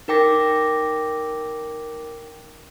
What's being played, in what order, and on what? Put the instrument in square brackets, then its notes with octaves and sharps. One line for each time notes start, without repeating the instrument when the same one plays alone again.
[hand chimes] D#4 A#4 G5 D6 A#6